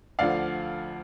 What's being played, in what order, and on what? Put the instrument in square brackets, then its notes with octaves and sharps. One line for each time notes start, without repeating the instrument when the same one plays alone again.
[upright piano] D2 D3 F3 D5 F5